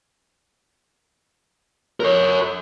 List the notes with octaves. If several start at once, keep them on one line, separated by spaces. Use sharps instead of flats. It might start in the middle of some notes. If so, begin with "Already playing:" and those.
A#4 C#5